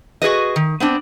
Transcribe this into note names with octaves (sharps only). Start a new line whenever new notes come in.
F#4 G#4 B4 D#5
D#3
B3 C4 D4